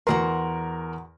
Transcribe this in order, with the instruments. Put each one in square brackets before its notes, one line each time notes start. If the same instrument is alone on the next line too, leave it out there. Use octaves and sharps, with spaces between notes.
[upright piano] E2 A#4 [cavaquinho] F#4 A#5 C6